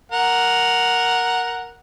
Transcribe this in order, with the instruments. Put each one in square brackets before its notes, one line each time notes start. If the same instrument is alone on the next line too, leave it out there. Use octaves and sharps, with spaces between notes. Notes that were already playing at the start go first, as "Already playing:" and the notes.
[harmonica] A#4 F#5